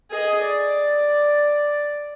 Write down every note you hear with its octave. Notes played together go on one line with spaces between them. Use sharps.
G#4 D#5
D5